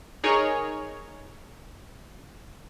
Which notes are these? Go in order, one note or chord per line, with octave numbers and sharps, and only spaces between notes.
D#4 G#4 A#4 C#5